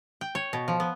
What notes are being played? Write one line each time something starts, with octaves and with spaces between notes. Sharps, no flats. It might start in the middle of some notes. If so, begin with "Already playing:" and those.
G5
C#5
B2
F3
B3